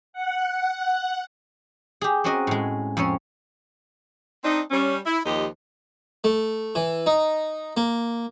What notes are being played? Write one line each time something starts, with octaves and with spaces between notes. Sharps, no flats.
F#5
G4 G#4
C4 C#4 F#4 A#4 D#5
A2 G#3
F2 C4 C#4 C#5
C4 D4 D#4
G3 C#4
E4
D#2 F3 G4 D#5
A3
E3
D#4
A#3